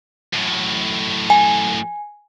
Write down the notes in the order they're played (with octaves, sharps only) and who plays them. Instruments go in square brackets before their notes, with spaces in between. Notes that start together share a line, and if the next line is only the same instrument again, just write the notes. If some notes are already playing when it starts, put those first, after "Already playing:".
[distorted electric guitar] F#2 A2
[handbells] G#5